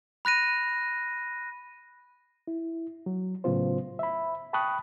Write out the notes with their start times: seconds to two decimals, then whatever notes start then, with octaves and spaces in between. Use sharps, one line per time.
0.25 B5 F#6 A#6 D#7
2.47 E4
3.06 F#3
3.44 A2 C#3 F#3 B3 F4 C5
3.99 E5 B5
4.53 G5 A5 B5 C#6 D#6 F#6